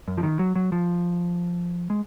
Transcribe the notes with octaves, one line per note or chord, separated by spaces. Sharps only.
F#2
F3
D#3
F#3
F#3
F3
G#3